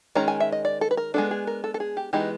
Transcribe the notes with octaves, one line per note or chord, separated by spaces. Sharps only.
D#3 G#3 C#4 A#5
G#5
E5
D#5
D5
A4
B4
A#4
G#3 B3 D4 A4
G#4
A#4
A4
A4
G#4
G4
E3 G#3 B3 D#4 G4